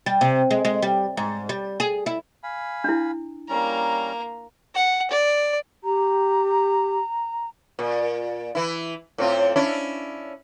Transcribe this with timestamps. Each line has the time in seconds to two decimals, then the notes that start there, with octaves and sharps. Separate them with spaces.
0.06 G3
0.21 C3
0.51 G#3
0.65 G#3
0.82 G3
1.17 G#2
1.49 G3
1.80 G#4
2.06 E4
2.43 F5 G#5 B5
2.84 D4 E4
3.49 G3 A#3 C#4 A#5
4.75 F#5
5.11 D5
5.84 G4 A#5
7.79 A#2
8.55 E3 E4
9.18 A2 C4 F4
9.56 C#4 D4 E4